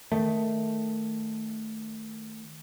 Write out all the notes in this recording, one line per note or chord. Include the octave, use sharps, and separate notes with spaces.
D#3 A3